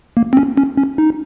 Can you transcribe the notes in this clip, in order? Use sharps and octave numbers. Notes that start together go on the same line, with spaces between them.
A#3
C4
C#4
C#4
C#4
D#4